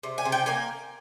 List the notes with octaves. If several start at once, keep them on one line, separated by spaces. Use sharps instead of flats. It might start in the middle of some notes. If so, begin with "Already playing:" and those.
C3
G#5
C3
G5
A#3 G#5